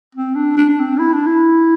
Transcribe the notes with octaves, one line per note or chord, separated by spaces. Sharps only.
C4
D4
D4
D4
C4
E4
D4
E4